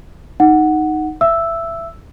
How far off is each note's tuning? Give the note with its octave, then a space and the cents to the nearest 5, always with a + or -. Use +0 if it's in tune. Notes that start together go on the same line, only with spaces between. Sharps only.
D#4 +0 F#5 +0
E5 +20 E6 +0